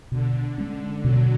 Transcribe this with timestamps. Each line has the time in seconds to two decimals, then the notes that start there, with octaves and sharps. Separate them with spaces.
0.12 B2 D3
0.58 G#3 C#4
1.04 B2 D3 F#3